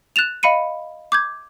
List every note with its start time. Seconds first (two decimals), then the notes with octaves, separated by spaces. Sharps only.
0.16 F#6 A6 E7 F7
0.43 D#5 F5 B5 C#7 D#7
1.12 D6 G6 G#6